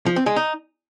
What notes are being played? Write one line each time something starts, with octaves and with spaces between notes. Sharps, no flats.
F3
C4
G#3
D#4